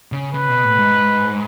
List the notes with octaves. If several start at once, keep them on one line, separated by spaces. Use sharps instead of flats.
C#3
C#3 B4
B2
A2
G#2